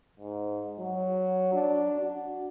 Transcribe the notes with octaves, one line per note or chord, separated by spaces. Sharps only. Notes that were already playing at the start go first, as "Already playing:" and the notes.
G#2
F#3
D4
F#4